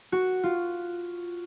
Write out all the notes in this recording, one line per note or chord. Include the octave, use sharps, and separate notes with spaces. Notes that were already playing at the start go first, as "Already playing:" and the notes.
F#4
F4